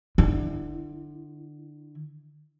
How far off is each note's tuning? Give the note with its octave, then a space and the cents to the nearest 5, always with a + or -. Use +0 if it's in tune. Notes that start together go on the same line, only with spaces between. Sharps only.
D3 +25 E4 +0